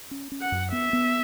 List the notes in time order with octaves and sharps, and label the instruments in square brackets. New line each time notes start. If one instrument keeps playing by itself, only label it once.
[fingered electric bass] C#4
C#4
[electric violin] F#5
[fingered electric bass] F#2
[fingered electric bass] B3 [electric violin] E5
[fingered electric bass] B3